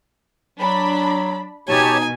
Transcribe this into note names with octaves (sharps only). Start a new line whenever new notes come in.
F#3 D4 B5
B2 D#4 G4 C#5 G#5 A5